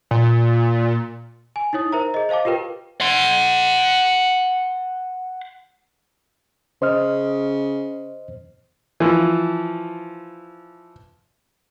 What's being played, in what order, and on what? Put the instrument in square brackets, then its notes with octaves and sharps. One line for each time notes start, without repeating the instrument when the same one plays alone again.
[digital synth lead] A#2
[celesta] G#5
D#4 E4 C#5 D#6
A#4 C5 E5 A#5
G#4 D#5
C5 D#5 F5 A5 D6
F4 G4 A#4 B4 G5
[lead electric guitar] F#5 C6
[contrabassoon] C#3 [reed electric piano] C5 D#5 F6
[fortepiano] E3 F3